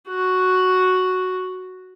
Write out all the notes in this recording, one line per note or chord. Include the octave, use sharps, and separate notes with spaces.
F#4